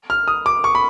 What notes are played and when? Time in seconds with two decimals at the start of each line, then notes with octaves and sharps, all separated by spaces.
0.10 F6
0.28 D#6
0.46 D6
0.64 C#6
0.75 B5